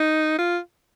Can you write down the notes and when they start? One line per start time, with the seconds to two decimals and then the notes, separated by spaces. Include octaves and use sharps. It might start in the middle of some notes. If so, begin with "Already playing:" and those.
Already playing: D#4
0.39 F4